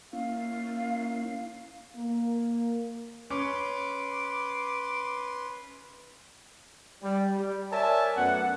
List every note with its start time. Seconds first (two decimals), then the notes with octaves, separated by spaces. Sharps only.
0.13 A#3 C#4 E4 F5
1.96 A#3
3.30 C#4 B4 C6 D6
7.03 G3
7.38 G3
7.71 A#4 C#5 D5 E5 G#5 A5
8.17 F#2 A3 B3 F#5